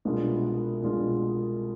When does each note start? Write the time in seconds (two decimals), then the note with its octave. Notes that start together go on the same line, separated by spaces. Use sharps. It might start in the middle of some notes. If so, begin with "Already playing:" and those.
0.05 C2 B2 G#3 D4 F4
0.83 C2 B2 G#3 D4 F4